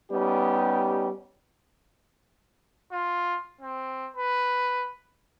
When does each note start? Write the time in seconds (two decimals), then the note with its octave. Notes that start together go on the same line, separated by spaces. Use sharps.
0.12 G3 B3 C#4 D#4 G4
2.92 F4
3.61 C4
4.16 B4